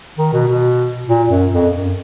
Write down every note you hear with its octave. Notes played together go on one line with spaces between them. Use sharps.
D#3
B2
B2
A#2
F#2
F2
F#2